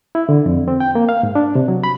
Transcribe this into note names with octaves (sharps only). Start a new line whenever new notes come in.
E4
D3
F2
C4
G5
A#3
F5
G#2
D4
C3
F#3
B5